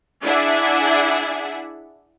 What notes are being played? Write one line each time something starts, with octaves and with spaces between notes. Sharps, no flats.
D4 E4 G#4 D5 E5 F#5